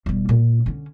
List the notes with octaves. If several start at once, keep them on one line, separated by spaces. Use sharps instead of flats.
E1 G3
A#2
D3 C#4